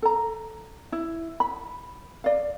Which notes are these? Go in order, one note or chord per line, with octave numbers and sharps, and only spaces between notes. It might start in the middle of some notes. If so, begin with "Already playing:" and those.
A4 A#5
E4
B5
D5 F5